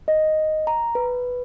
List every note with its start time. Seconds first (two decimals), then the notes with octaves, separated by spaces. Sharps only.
0.08 D#5
0.67 A#5
0.95 B4